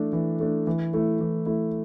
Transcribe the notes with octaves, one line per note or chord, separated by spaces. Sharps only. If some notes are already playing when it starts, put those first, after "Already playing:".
Already playing: E3 A3 D4
E3
A3 D4
E3
A3 E4
E3
A3 E4